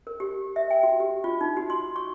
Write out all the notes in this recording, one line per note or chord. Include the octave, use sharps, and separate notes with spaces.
A#4
G4
E5
G5
F#4
G4
F4
D#4
F#4
C6
C#6